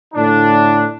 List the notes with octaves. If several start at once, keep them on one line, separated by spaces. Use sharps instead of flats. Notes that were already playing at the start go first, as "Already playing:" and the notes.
A2 D3 D4